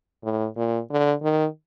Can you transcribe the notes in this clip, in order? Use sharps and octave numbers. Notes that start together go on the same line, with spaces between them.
A2
A#2
D3
D#3